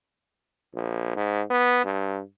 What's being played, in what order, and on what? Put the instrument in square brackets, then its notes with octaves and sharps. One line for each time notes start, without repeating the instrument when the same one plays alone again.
[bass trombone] A#1
G#2
B3
G2